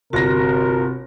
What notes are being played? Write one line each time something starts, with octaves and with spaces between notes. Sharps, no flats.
G1 C3 F#4 A#4 A#6